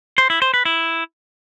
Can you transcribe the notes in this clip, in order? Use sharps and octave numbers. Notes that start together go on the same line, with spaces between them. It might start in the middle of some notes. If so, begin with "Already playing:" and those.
C5
E4
C5
B4
E4